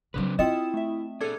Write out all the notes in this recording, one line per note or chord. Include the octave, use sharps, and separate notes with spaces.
C#3 F#3 C4 D4 B4
C4 E4 F4 D#5 G5 D#6 E7
A3 E5
D4 G#4 A4 D6 G#6